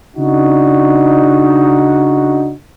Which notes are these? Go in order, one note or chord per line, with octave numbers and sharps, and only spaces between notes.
C#3 D4 D#4 F#4